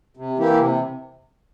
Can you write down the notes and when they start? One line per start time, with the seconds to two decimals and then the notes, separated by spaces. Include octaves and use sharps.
0.17 C3
0.37 E3 A#3 E4 G4
0.59 C3